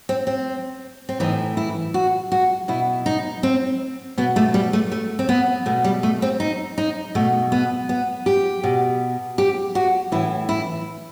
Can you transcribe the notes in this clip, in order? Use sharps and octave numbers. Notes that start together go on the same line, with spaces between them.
C4
C4
C4
A2 E3 D#4
E4
F#4
F#4
B2 E4
D#4
C4
B2 B3
A3
G3
A3
A3
C4
B3
B2 A3
G3
A3
C4
D#4
D#4
B2 A3
B3
B3
G4
B2
G4
F#4
A2 E3 E4
E4